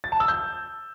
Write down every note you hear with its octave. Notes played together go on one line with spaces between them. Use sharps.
A6
A5
E6
G6